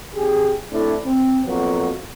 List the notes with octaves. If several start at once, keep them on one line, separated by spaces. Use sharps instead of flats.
G#1 G4 G#4
A3 C4 D4 E4
C4
F2 F#3 A#3 B3 F#4